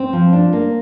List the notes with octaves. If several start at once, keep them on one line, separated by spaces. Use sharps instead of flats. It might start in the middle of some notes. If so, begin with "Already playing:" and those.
Already playing: C4 C5
F3
D4
A#3